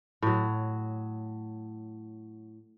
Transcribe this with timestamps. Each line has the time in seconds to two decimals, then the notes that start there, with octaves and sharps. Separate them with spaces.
0.22 A2 F#3